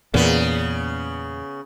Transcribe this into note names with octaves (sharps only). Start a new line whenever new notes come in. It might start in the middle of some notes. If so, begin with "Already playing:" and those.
E2 A#2 C#3 B3